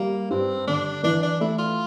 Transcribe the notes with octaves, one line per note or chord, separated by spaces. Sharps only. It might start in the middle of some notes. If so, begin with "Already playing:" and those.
Already playing: G3 A#3
G2 C4
D3 D4
E3 D4
D4
A3 E4
F4